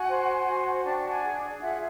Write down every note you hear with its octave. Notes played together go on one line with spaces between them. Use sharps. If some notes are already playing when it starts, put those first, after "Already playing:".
Already playing: F#4 F#5 G#5
C5
F#4
G#5
D4 G5 A5
F#5 G#5
G#4
F4 E5 F#5